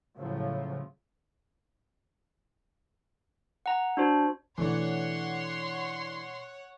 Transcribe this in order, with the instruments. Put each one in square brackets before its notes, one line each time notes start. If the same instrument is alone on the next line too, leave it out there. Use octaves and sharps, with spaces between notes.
[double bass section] A2 C#3 F3 F#3
[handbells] F#5 A#5
D4 F#4 C5
[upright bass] B2 [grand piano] E3 A3 D4 [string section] C#5 F#5 [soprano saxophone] C6